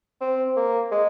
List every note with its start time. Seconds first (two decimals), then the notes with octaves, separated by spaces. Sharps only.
0.21 C4
0.56 A#3
0.92 G#3